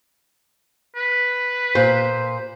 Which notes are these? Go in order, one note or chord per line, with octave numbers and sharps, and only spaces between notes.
B4
A#2 C5